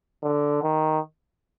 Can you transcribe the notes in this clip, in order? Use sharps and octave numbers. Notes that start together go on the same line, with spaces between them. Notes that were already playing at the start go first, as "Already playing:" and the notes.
D3
D#3